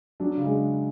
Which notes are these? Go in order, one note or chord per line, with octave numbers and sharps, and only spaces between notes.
F#3 D4
C#3
G#3